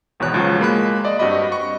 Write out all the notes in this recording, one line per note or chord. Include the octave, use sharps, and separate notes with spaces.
G#1 E2 B2 C#5 F#6
C#2 F3 F#3
G#3 A#3 B5 F#6
D5 D#5
G2 C4 F#4 D5 D#5 B5
C#6